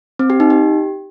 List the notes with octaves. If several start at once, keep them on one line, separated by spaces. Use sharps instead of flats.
C4
G4
D#4
G4